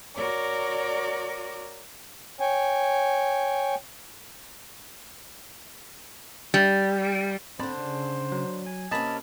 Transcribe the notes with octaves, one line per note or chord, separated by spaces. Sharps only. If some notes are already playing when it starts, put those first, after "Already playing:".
F#4 A#4 C#5 D5 D6
C#5 G5 G#5
G3
D3 C4 D4 C5 D5 B5
C#3
F#3
G#5
C3 A#3 C#4 D#5 A5 B5